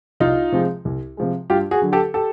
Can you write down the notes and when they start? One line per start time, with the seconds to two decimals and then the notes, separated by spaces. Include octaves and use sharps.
0.20 C2 D#4 F4
0.52 C3 F3 G#3
0.85 C2
1.17 C3 F3 G#3
1.50 G2 F4 G4
1.71 F#4 G#4
1.82 D3 F#3
1.93 G4 A4
2.14 G4 A4